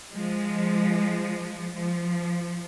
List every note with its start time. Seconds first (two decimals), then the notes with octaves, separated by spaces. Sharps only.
0.11 F3 G#3
1.74 F3